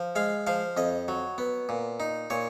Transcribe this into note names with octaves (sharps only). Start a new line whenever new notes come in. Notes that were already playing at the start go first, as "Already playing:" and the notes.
Already playing: F3
G#3 F5
F3 F5
F2 D#5
F#3
B3
A#2
D#4
A#2 C#5